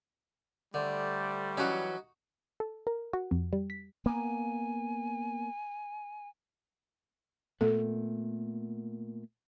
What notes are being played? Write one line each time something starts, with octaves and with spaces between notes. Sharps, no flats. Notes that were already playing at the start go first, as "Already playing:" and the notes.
D3 G3 A3 C5 D5
E3 F#3 C#4 D#4 F#4
A4
A#4
F#4
F2
G3
B6
A#3 B3 G#5
A#2 A3 B3 A4